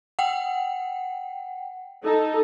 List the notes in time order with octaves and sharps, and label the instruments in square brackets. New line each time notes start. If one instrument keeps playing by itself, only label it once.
[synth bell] F#5 G5
[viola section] D#4 A4